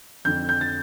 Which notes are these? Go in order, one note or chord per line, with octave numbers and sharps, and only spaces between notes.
F2 D3 G6
G6
A6